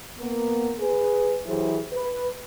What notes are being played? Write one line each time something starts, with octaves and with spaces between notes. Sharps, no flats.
A#3 B3 A#4
G#4 B4
E3 F#3 E4 G4 G#4 C5
B4